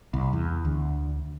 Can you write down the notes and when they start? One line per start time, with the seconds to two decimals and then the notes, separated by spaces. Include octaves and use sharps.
0.14 C2
0.33 E2
0.65 D2